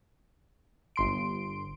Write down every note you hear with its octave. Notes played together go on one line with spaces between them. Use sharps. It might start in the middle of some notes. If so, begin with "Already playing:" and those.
G1 C6 D7